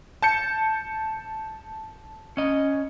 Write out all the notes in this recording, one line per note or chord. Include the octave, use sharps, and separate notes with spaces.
A5 G6 C#7
C#4 D#5